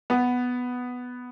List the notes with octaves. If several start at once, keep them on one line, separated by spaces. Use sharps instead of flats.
B3